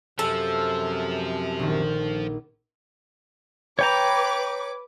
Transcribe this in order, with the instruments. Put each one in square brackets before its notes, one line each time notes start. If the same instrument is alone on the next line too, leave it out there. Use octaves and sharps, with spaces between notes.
[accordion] F#2 C3 [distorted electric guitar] F3 [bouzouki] A4
[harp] A#1 D#3
[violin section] B4 D6 [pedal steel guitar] C#5 G5 A#5